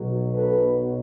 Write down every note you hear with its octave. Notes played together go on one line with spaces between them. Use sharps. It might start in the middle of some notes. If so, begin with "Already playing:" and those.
Already playing: B1 B2 F#3
A4 B4